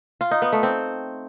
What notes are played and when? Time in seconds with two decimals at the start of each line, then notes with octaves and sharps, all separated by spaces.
0.21 F4
0.31 D#4
0.42 B3
0.52 A3
0.63 C4